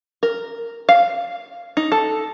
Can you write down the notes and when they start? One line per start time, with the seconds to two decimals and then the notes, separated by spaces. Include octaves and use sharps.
0.23 A#4
0.89 F5
1.77 D#4
1.92 A4